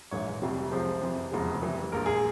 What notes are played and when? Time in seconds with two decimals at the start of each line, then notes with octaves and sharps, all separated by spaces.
0.11 A#1 G#2 E3 C#5
0.42 F1 F2 C3 G3
0.71 C2 C3 F3 G#3 C5
1.01 F2 C3 E3
1.31 F1 E2 C#3 F3 G#3
1.62 F1 F2 E3 G3
1.92 A#1 A#2 G#3 A#4
2.06 G#4